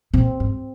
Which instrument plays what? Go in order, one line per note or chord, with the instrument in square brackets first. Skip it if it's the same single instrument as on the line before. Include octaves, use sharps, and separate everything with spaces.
[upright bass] A#2 [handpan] C4
[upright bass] G#2